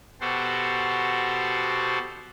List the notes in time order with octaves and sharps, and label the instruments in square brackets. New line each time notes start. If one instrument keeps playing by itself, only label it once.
[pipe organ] B2 F#4 G4 A4 C5